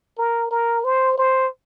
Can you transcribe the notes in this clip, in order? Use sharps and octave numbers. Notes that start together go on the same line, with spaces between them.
A#4
A#4
C5
C5